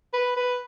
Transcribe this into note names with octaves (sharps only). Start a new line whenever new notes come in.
B4
B4